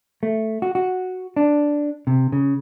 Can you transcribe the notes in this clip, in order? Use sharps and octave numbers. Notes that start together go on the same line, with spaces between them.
A3
F#4
F#4
D4
C3
C#3